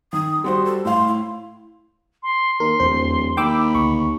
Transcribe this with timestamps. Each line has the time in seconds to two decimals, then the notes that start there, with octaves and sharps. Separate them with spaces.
0.13 D#3 D#6
0.44 G3 F#4 C5 C6
0.65 A4
0.85 A2 F5 C6
1.08 E4
2.23 C6
2.60 D#2 A#4 C6
2.80 D1 E2 C5
3.37 D#2 G5 B5 D6 E6
3.75 D2 C#6